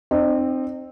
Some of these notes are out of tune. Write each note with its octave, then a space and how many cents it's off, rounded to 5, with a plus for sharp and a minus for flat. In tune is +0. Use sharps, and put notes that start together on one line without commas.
C4 +0 D#4 -40